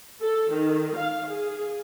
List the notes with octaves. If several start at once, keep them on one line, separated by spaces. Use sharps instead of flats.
A4
D#3
F5
G#4